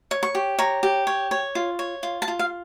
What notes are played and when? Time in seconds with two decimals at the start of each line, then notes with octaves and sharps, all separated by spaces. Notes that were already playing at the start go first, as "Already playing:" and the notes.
0.11 C#5
0.23 C#6
0.35 G4
0.59 C#5 A#5
0.83 G4
1.07 C#5
1.31 C#5
1.55 F4
1.79 C#5
2.03 F4
2.22 A5
2.28 F4
2.39 F5